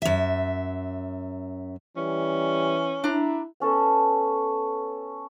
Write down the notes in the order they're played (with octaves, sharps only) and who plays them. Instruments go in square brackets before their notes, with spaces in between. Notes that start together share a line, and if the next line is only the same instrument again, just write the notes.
[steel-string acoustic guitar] F#2 E5
[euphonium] E3 [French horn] G3 [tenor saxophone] C#4
[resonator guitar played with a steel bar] D4 A#5 [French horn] E4
[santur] B3 C#4 A4 A5